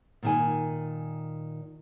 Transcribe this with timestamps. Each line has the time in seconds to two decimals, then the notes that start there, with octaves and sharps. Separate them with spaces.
0.23 A#2 D#3 G#5